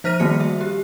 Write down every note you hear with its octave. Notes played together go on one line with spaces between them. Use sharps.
F3 C5 F6 A#6 D#7
D#3 G3 A3 A#3 F#4 C#7
E5
G4